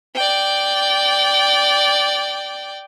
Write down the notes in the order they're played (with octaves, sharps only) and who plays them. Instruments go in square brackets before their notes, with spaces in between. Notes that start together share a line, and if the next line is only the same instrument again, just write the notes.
[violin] D5 G5